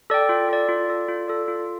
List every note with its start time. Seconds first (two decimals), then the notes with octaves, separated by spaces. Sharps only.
0.10 A4 D5 G5
0.29 F4
0.49 A4 D5
0.69 F4
0.88 A4 D5
1.09 F4
1.28 A4 D5
1.48 F4